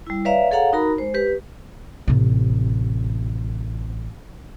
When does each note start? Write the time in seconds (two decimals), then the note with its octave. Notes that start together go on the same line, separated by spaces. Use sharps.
0.07 G3 E4
0.25 B4 C#5 D5 E5 F5 A#5
0.51 G#4 A4 C#5 F5 F#5 A#5
0.73 D#4 F#4 A#4 A#5 B5
0.98 G#3 C5
1.14 G4 B4
2.08 A1 C3